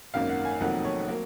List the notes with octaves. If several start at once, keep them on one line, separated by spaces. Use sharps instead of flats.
G#1 F#2 D#3 A#3 F5
F#5
G#5
F1 F2 D#3 F#3 A#3 F#5
C#5
F#3 A#3